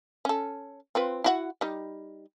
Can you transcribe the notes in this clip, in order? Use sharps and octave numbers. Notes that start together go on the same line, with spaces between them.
C#4 A4
C4 F4 B4
E4 F#4 F#5
G3 D#4